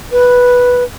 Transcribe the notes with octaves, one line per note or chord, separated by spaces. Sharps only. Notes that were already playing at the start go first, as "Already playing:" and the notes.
B4